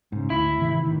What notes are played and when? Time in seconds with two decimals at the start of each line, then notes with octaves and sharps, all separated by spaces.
0.12 G#2 C#3
0.30 D2 E4
0.58 G#1 C3 E3
0.85 A1 D#3 E3